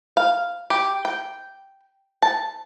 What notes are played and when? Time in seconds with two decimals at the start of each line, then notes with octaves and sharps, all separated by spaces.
0.17 F5
0.70 G4
1.05 G5
2.22 A5